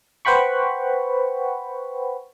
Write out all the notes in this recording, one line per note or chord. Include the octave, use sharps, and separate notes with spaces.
B4 C5 F#5 G5 B5 C#6